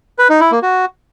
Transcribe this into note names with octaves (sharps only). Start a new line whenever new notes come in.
B4
D#4
E4
A#3
F#4